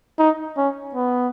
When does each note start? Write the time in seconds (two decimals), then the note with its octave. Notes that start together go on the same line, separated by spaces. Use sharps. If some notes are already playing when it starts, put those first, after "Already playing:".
0.19 D#4
0.57 C#4
0.95 B3